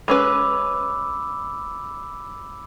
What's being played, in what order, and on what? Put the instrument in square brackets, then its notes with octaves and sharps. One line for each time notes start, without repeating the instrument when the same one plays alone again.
[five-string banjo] G#3 C#4 B4 [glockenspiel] B5 D6 E6